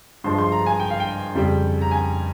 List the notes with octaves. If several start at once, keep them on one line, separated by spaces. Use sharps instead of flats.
G2 F3 G#3 C6
C6
A#5
G#5
G5
F5
G5
F2 C#3 G3
A#5
G#5